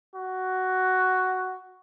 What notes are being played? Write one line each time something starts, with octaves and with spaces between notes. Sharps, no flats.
F#4